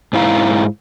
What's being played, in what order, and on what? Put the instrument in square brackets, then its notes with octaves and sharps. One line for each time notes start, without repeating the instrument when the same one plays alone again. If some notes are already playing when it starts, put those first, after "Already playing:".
[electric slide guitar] G#2 E4 F5 A#5